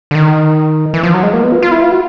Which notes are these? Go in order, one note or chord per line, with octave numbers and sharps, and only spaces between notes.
D3
D#3
E3
F3
F#3
G#3
A#3
B3
F4
F4
E4
F4
F#4